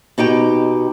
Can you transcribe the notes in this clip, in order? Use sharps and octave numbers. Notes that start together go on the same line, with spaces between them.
B2 D#4 G4 G5